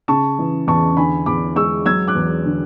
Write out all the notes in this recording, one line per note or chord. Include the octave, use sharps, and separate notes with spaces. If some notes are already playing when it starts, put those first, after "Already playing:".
C#3 A5 C#6
E3
E2 A5 C#6
D3 G#5 B5
E2 B5 D6
G#3 C#6 E6
F#3 E6 G#6
D6 F#6
E2
D3